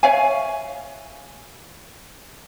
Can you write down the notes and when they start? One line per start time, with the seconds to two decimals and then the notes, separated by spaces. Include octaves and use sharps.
0.03 C#5 E5 F5 G#5